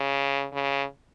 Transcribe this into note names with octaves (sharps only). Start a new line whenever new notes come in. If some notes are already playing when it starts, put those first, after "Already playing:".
Already playing: C#3
C#3